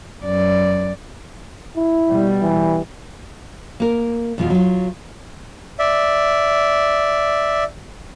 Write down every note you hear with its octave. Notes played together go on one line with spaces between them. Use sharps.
F#2 D5
E4
B2 G3
E3
A#3 A#4
E2 B2 G#3 F4
F#3 F4
D5 E5